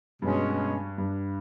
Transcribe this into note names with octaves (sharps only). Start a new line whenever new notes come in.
G2 B2 G#3 C#4
G2